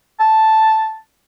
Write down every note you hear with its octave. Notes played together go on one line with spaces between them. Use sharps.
A5